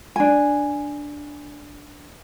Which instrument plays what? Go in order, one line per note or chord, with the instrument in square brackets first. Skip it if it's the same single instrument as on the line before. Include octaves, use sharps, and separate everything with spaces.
[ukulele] D4 G#5